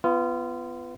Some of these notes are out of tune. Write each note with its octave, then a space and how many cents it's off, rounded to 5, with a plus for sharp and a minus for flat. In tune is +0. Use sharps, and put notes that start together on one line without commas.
B3 +15 F4 -25